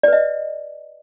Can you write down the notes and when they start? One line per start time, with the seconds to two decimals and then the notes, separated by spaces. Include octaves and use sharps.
0.03 D5
0.08 B4
0.13 D#5